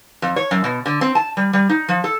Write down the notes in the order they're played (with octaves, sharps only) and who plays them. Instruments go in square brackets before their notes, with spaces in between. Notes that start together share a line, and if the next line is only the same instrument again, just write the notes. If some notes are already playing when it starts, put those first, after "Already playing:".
[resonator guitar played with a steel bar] F2
C#5
F#2
B2
D3
C4
A5
G3
G3
D#4
F3
A4